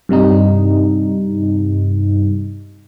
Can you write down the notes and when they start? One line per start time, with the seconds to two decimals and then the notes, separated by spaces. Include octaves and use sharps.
0.09 G2 C3 G3 D#4